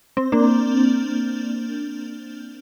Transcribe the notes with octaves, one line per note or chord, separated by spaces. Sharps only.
C4
A#3 D4